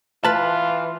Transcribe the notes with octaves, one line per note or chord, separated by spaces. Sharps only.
E3 F4 B4 A5